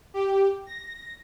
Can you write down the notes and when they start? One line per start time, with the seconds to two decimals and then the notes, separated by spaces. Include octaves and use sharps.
0.14 G4
0.66 A#6